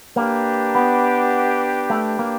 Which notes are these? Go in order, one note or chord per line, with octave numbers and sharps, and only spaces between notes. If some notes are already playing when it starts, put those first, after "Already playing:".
A#3 D4 G4 B4
B3
A3
A#3